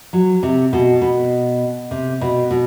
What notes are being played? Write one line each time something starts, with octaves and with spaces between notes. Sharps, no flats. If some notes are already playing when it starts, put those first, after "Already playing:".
F#3
C3
B2
B2
C3
B2
B2